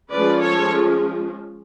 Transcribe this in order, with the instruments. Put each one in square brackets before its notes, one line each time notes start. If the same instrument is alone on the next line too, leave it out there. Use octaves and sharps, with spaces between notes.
[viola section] F3 G#3 C#4 B4 D5
A4 C#5